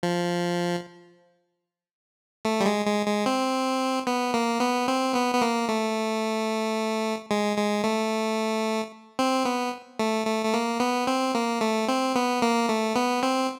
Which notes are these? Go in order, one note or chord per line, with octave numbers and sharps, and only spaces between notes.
F3
A3
G3
G#3
G#3
G#3
C4
B3
A#3
B3
C4
B3
B3
A#3
A3
G#3
G#3
A3
C4
B3
A3
A3
A3
A#3
B3
C4
A#3
A3
C4
B3
A#3
A3
B3
C4